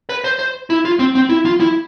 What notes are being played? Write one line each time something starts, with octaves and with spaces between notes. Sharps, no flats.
B4
C5
C5
E4
F4
C4
C4
E4
F4
E4